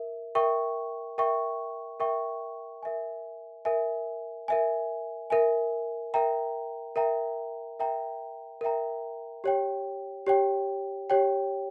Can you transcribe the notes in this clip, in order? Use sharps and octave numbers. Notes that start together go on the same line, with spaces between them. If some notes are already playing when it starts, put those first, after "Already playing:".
Already playing: A#4 E5
A#4 E5 G5 C#6
A#4 E5 G5 C#6
A#4 E5 G5 C#6
A#4 E5 G#5
A#4 E5 G#5
A#4 E5 G#5
A#4 E5 G#5
A#4 E5 G5 A#5
A#4 E5 G5 A#5
A#4 E5 G5 A#5
A#4 E5 G5 A#5
G4 C#5 G5
G4 C#5 G5
G4 C#5 G5